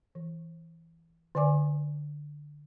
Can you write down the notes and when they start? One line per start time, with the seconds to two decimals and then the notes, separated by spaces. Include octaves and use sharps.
0.15 E3
1.35 D3 B4 D5 G#5 D6